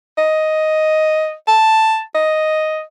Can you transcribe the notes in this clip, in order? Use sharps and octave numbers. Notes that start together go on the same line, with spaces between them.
D#5
A5
D#5